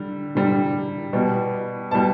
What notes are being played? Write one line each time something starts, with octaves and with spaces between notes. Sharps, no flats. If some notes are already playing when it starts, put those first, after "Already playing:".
Already playing: D3 G3
D3 G3
B2 G3
B2 G3 A5